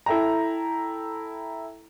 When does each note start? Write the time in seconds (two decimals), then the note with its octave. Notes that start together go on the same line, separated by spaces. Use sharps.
0.06 E4 A4 E5 G5 A#5